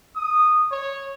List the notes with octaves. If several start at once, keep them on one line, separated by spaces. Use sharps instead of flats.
D#6
C#5